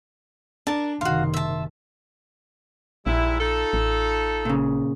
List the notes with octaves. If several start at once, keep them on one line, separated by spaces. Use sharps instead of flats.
D4 A#4 A5
F#1 C3 D#3 F#4 F5 C6
E5 A5
A#1 G#2 G3 E4
D#4 F4 A4
A1
A#2 C#3